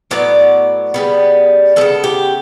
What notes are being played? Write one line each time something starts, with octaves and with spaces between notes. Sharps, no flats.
A2 F#3 B3 D5
C#3 G3 B3
C#3 G3 B3 A4
G4